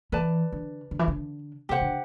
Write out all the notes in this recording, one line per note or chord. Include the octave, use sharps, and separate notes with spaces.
E3 B4 D5 A5
D3
D3
E3
D3
C3 G4 C5 F#5
D3